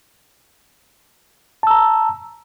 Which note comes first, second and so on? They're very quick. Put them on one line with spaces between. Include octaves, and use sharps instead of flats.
A5 E6 A#5